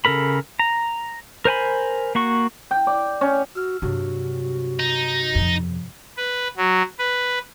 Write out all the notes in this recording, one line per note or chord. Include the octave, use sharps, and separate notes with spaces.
C#3 A4 A#4 B5
A#5
A#4 C5 G#5 B5
A#3 F#4 C#6
G5
D5
C#4
F#4 E6 F6
G2 C3 F#3 D4 F#4
D#4
F2 B2
B4
F#3
B4